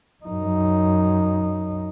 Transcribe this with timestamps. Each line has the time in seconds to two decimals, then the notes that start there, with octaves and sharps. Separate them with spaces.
0.24 F#2 D#4